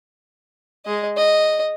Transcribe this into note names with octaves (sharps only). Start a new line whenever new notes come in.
G#3 D#5
D#5